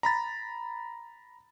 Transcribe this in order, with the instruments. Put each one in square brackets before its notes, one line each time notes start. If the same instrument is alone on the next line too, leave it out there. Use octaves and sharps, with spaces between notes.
[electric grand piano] A#5 B5 A6